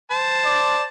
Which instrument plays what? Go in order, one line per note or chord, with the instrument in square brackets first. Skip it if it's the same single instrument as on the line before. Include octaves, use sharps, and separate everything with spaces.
[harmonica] C5 A5
[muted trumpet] D5